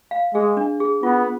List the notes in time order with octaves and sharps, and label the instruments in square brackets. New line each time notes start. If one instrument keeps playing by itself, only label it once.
[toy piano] F5
[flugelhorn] G#3 [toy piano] G#4
[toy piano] D4
G#4
[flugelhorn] B3 [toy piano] F4